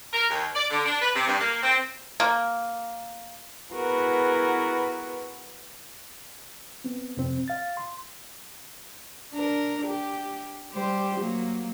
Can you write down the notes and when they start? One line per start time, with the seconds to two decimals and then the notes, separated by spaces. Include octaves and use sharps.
0.13 A#4
0.30 D#2
0.56 D5
0.71 D3
0.86 D4
1.02 B4
1.15 C3
1.28 G2
1.41 A#3
1.63 C4
2.20 A#3
3.73 B3 E4 F#4 G#4 A#4 B4
6.84 B3 C4
7.17 F2 C3 C4
7.48 F5 A6
7.77 C6
9.33 D4 A#4
9.86 G4
10.72 G3 G4 C5
11.18 F#3 A#3